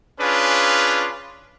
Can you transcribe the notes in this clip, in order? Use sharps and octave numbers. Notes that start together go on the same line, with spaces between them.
C#4 D4 F4 G#4 B4